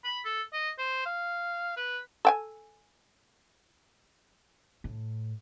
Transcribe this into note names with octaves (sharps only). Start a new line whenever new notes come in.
B5
A4
D#5
C5
F5
B4
A4 G5 G#5
A2